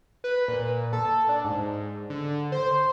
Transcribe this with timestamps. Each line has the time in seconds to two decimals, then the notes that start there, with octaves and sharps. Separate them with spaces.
0.24 B4
0.48 A#2
0.93 A4
1.29 D4
1.44 G#2
2.10 D3
2.52 C5